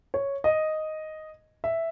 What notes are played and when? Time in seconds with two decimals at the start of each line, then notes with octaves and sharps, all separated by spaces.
0.14 C#5
0.44 D#5
1.64 E5